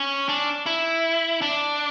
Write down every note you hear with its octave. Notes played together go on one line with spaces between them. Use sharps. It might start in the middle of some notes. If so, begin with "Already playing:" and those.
Already playing: C#4
D4
E4
D4